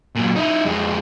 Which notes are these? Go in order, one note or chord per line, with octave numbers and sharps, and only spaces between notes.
A#2 F#3
D#4 E4
F2 G#3